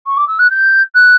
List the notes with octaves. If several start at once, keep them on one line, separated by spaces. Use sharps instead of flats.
C#6
D6
E6
F#6
G6
F#6